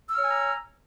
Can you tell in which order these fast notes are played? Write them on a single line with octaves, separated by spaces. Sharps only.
E6 F6 C#5 G#5 A#5